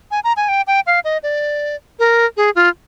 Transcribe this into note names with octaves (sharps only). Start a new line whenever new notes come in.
G#5
A#5
G#5
G5
G5
F5
D#5
D5
A#4
G#4
F4